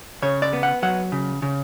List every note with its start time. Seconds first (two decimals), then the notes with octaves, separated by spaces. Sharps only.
0.22 C#3 C#5
0.42 D5
0.53 B3
0.63 F#5
0.83 F#3 F#5
1.12 C#3
1.42 C#3